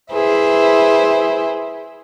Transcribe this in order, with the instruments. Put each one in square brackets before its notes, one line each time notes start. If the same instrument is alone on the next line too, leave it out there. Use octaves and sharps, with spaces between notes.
[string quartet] E4 G#4 B4 C5 E5